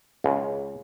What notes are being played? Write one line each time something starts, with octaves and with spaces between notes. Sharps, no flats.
C#2